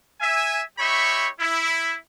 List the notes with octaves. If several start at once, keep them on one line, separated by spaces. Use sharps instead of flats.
E5 G#5
D#4 G4 C#5 E5 B5 C#6
E4